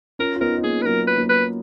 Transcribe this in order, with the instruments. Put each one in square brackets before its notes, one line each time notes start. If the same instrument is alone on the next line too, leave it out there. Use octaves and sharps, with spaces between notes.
[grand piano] C#4 F4 [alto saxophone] A#4
[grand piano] F4
[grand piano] B3 D#4 [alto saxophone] A#4
[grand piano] D#4
[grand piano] A#3 C#4 [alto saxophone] G#4
[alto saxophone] B4
[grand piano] F#3 A#3 [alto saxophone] A#4
[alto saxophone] B4
[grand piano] F#3 A#3
[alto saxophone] B4